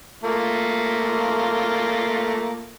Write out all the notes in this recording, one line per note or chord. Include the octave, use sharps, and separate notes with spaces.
A3 A#3 F4